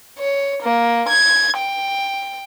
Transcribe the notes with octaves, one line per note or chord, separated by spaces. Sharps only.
C#5
A#3
G#6
G5